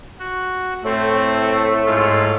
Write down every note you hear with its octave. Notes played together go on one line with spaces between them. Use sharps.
F#4
A2 A3 C4
G#2 F4